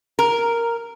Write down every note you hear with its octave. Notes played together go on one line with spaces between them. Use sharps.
A#4